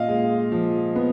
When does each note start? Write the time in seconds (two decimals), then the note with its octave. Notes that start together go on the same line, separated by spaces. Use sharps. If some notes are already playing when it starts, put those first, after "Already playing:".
Already playing: A#2 D#5 F5
0.08 G#3
0.52 F3
0.96 B3